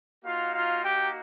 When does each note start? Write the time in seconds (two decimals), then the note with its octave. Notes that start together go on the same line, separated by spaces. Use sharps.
0.25 A#3 D#4 F4 F#4 F5
0.55 F4 F5
0.83 G4 G5